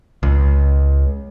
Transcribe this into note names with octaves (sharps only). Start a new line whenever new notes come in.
C#2